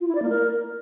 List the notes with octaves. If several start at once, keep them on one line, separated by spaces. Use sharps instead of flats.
F4
E4
D5
A#3
A#4